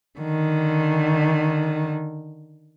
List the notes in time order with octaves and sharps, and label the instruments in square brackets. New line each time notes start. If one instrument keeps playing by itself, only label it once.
[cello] D3 D#3